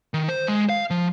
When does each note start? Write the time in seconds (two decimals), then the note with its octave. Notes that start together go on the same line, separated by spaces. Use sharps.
0.14 D#3
0.29 C5
0.48 G#3
0.69 F5
0.90 F3